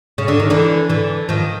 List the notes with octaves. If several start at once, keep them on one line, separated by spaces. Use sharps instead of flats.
C#3
D3
D#3
D3 E3
D3 E3
D#3 F3